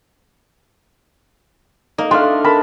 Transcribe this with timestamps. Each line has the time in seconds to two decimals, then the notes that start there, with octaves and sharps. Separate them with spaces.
1.98 A#3 D#4
2.11 A3 D4 F5 C6
2.44 A#4 A5 B5